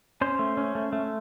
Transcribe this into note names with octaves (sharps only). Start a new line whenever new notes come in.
C#4 C5
A3
C#4
A3
A3